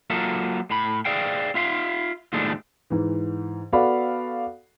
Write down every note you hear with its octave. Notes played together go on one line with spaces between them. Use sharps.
F#3 A#3 F4 A4 E5
A2 B5
G#4 D5 E5 F5 G5
F4 E5 F5 C6
D#2 A2 F3 G#3 A3 D4
G#2 E3
B3 F#4 A4 D5 F5 B5